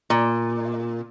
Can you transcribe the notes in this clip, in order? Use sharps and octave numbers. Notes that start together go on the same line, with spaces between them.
A#2